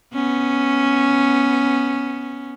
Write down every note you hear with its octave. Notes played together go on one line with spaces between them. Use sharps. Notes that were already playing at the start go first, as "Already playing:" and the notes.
B3 C#4